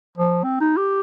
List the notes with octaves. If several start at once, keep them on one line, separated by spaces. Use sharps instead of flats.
F3
C4
D#4
G4